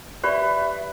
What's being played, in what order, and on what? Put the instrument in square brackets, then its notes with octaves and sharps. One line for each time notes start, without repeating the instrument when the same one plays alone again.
[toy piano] G4 D5 B5 [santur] B4 [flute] E5